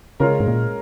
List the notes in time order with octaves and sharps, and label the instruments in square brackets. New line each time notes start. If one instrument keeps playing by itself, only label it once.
[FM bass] C#3 [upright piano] G#3 C#4 F4 A#4
[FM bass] G#2
A#2